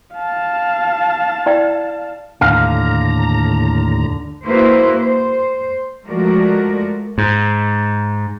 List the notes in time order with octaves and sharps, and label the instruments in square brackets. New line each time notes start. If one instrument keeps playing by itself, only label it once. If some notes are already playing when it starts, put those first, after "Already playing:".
[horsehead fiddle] F5 A5
[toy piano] E4 D5 G5
[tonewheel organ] D#2 A2 A#5 [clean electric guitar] D3 F5
[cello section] A#3 E4 F#4 B4 C5
C5
F3 G#3 A3 F#4 A#4 D5
[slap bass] G#2